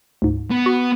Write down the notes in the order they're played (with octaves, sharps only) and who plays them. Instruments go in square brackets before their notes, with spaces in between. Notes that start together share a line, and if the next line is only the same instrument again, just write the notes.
[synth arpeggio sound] D2 G#2
[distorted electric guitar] B3
[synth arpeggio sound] F#4